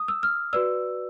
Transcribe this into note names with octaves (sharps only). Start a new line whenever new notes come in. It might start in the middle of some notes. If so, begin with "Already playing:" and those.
Already playing: D#6
E6
F6
F#4 B4 D5 E6